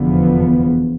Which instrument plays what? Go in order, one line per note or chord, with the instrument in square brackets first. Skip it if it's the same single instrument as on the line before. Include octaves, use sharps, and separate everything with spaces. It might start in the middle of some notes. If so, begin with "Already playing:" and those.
Already playing: [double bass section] F1 E2 D3 F3 B3